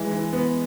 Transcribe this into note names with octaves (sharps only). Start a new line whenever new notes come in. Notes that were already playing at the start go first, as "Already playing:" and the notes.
Already playing: E3 G#3
E3
B3